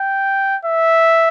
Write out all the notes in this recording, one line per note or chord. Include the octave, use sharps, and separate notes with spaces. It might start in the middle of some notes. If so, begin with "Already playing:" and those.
Already playing: G5
E5